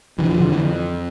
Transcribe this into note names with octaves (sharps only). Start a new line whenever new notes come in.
F2 D3 E3
F3
D3
E3